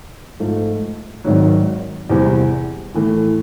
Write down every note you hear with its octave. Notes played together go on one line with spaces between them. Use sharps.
G#2 F3 A3
G#1 G#2 D#3 F#3
E2 C3 E3 G3
A2 E3 A3